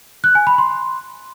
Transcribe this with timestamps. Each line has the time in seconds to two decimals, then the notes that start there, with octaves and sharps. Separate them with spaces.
0.24 F#6
0.35 G#5
0.47 B5
0.58 C6